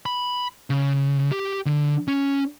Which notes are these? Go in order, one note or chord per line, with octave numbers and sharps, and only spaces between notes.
B5
C#3
G4
D3
C#4